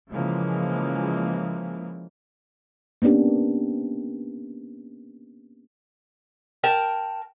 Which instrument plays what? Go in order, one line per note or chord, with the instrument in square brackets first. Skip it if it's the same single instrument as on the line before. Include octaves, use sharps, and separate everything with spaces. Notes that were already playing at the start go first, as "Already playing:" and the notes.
[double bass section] C#3 E3 F3 G#3 A#3
[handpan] A#3 B3 C#4 D4 G4
[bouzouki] A#4 G5 A5